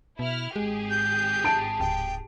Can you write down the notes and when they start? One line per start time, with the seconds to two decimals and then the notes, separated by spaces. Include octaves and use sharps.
0.19 B2 E4 F6
0.56 G#1 G#3 G4 G#4
0.90 G6
1.44 A5 D7
1.80 D1 G5